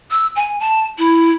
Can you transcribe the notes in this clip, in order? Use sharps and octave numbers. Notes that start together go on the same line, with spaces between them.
E6
G#5
A5
E4